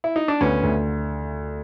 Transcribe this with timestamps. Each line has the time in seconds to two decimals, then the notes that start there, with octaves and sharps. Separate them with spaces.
0.04 E4
0.16 D#4
0.28 D4
0.41 D2 B3 C#4
0.63 D2